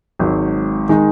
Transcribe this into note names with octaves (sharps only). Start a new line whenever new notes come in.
G#1 G#2 F#3
D#3 G#3 D#4